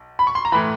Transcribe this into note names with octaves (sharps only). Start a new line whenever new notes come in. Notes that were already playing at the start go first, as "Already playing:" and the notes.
Already playing: B1
B5
C#6
C6
A#5
A2 E3 B5